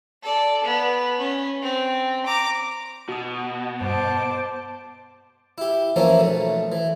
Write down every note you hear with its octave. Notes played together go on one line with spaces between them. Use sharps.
A4 D5
B3
C#4
C4
A#5 D6
B2 F#4 D#6
G2 C5 A5 D6
E4 G4
E3 F3 A#3 C#4 E4
B1 A3
E3